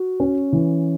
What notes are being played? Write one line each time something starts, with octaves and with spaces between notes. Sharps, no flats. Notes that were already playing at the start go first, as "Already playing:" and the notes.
Already playing: F#4
C#4
E3